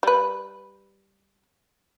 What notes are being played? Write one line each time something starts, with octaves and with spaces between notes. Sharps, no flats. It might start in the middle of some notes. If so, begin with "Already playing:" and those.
G3 B4